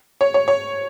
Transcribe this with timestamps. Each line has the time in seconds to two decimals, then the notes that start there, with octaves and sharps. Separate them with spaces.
0.21 C#5
0.34 C#5
0.48 C#5